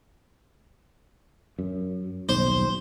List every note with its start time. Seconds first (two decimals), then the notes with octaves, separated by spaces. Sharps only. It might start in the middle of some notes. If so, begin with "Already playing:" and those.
1.59 F#2
2.29 D#1 B1 C5